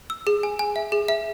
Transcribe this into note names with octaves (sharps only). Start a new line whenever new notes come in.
E6
G#4
G#5
G#5
E5
G#4
E5